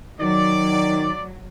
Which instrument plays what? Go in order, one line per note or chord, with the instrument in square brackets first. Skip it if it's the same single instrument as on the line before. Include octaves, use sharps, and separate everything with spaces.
[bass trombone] D#3 [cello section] F#3 [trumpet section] D5